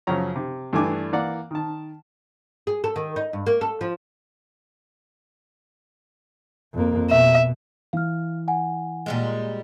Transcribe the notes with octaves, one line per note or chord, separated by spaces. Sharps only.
F#2 C#3 F3 C#4 A#5
C3
G2 E3 A3 D4 G#5 D6
E3 A#3 D5 F#5
D#3 A5
G#4
A4
D#3
D#4
G2
A#3
A4
F3
F2 A#3
B2 E5
E3 F5 F6
F#5 G#5
A#2 G3 G#3